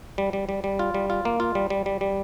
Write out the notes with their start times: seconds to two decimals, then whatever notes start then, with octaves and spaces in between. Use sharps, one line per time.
0.18 G3
0.33 G3
0.49 G3
0.64 G3
0.79 F4
0.94 G3
1.10 F4
1.25 A#3
1.40 F4
1.55 G3
1.70 G3
1.86 G3
2.01 G3